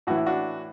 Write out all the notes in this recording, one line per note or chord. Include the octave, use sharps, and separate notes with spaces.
A2 E3 F#4
E4
D4 F#4